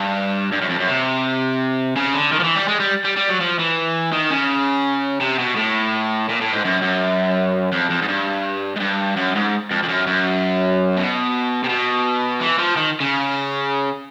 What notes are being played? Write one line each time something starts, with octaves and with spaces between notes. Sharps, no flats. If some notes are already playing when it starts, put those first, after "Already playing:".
Already playing: G2
G2
F#2
F2
F#2
C3
C#3
D3
D#3
F3
E3
G3
G#3
G3
G3
G3
F#3
F3
E3
D#3
C#3
C3
B2
A2
A#2
A2
G#2
F#2
F#2
F2
F2
G#2
G2
G#2
G2
F#2
G#2
F2
F2
F#2
F#2
B2
C3
B2
E3
F3
D#3
C#3